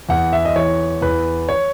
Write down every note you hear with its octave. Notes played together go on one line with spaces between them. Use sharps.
E2 F#5
E5
D#5
E3 C#5
E2 B4
C#5